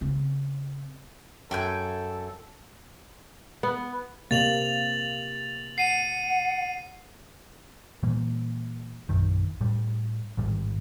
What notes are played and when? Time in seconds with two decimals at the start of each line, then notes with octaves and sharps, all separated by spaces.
0.01 C#3 C4
1.51 F#2 A4 G5 G#5 G6
3.63 B3
4.31 C3 A#3 A6 F7 F#7
5.78 F#5 C7 D#7
8.03 A#2 E3 G3 A#3
9.09 A#1 F#2 D#3
9.61 A2 G3
10.37 A1 G#2 D#3 G3